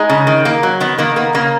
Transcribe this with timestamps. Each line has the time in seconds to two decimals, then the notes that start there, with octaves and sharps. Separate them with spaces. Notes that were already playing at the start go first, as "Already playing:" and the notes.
Already playing: G#3 D#4
0.09 C#3
0.27 D#3
0.45 A#3
0.63 F#3
0.80 D#3 B3
0.98 D#3 A#3
1.16 A#3 B3
1.34 C#3 A#3